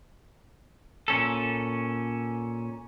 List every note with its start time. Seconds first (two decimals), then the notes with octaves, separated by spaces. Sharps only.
1.08 A#2 C#4 A4